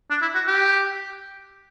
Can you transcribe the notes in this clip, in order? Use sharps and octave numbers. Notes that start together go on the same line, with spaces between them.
D4
E4
F#4
G4